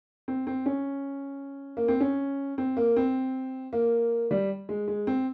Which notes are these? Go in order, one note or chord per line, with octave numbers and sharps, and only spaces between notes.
C4
C4
C#4
A#3
C4
C#4
C4
A#3
C4
A#3
G3
G#3
G#3
C4